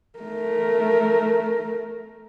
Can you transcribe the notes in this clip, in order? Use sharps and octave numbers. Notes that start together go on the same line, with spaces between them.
A3 A#4